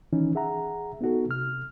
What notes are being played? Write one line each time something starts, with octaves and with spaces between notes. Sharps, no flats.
D#3 E3 C#4 D#4
G#4 E5 F#5 A#5
B3 D#4 F#4 A4
C3 F6